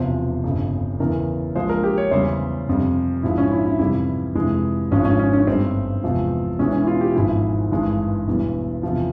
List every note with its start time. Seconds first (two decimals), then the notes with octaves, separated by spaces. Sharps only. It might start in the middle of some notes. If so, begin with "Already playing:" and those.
Already playing: E1 E2 C3 F3 C5
0.44 G1 F2 C#3
1.00 E2 C#3 E3 A#4
1.56 A#1 A#2 F3 G#3 C5
1.69 A#4
1.83 G4
1.98 C#5
2.11 E2 C#3 G3 C5
2.67 F1 F2 C3 G3
3.23 A#1 G#2 F3 G#3 E4
3.38 C#4
3.52 E4
3.66 E4
3.79 F2 C3 E3 G3 E4
4.35 F1 F2 E3 G#3
4.91 G#1 G#2 F3 G#3 C#4
5.05 C#4
5.19 C#4
5.33 C#4
5.47 G1 G2 G3 C4
6.03 E2 C3 F3 G#3
6.59 E1 E2 E3 G#3 C#4
6.73 C#4
6.83 E4
6.87 F4
7.01 G4
7.15 G#1 G#2 F3 G#3 E4
7.71 G#1 G2 E3 G#3
8.27 E1 E2 E3 G3
8.83 E2 C3 F3